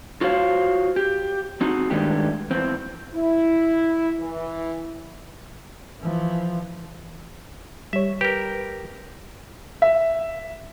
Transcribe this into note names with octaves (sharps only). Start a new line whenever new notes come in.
F4 F#4 C5 C#5 F5
G4
C4 D#4 F#4
G2 D#3 G#3 A3 D4 G4
E2 C4
E4
E3
E3 F3
G3 C#5 E5
G4 A#4 B4
E5